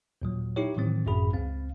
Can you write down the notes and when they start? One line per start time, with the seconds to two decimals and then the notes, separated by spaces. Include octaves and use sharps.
0.22 D#2 A#2 F#3
0.56 D#4 E4 G4 C#5
0.76 A2 D#3 E3 F#3 C4
1.06 G#1 F#2 A2 G#4 B5
1.33 C#2 C4 F5